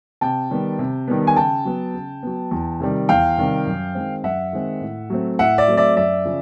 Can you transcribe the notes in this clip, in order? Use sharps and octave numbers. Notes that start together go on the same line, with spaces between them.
C3 G5 A5
D#3 G3 B3
C3
D#3 G3 B3
G#5
C#3 G5 A5
F#3 B3
C#3
F#3 B3
E2
C3 D#3 G3
E2 F5 G5
C3 D#3 G3
F#2
D#3 G#3 C4
F#2 E5 F#5
D#3 G#3 C4
A2
F#3 A3 C4
A2 E5 F#5
D5 E5
F#3 A3 C4
D5 E5
F#2 D5 E5
C#3 F3